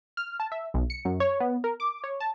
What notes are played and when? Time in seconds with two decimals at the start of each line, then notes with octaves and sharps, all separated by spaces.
0.17 F6
0.40 A5
0.52 E5
0.74 B1
0.90 C#7
1.05 F#2
1.20 C#5
1.40 B3
1.64 A#4
1.80 D6
2.04 C#5
2.20 A5